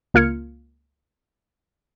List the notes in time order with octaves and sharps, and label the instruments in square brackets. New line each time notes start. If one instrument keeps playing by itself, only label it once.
[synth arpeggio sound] C#2 A#3 F4 F6 G#6 C#7